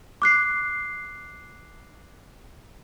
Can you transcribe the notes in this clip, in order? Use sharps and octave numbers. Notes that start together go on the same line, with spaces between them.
D6 F#6 C7